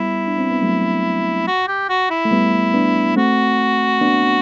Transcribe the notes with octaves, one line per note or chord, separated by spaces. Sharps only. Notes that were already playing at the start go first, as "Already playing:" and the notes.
Already playing: G3 B3 E4
D4
C4
B3
F#3 A3
F#4
G4
F#4
E4
A3
G3 B3
B3 D4
A3 C4 F#4
B3 D4